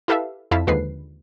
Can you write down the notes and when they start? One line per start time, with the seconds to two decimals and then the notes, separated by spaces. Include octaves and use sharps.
0.08 E4 G4 A4 B4 E5 F5
0.51 F2 E4 F5 A5 B6
0.67 D#2 D3 F3 G#3 B4 C7